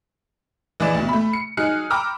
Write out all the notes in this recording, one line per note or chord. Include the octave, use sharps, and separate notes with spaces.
A#1 E3 G#4 D5 D#5 E7
D2 B2
A3 B5
C#7
F#3 D#4 G#4 F6 F#6 C#7
G5 A#5 B5 D6 E6 F6